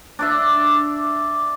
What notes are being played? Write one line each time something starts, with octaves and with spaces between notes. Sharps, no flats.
D4 D5 E5